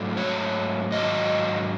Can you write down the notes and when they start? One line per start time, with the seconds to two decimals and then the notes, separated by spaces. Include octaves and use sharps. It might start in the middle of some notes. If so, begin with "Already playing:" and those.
Already playing: G#2 F#3 A3
0.17 C#5
0.91 G#2 D#3 F#3 D#5